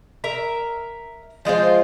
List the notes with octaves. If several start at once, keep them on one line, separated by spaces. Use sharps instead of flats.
A#4 E5 A#5
F3 G#3 F4 C5